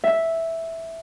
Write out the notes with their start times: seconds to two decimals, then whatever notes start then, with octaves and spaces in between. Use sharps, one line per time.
0.04 E5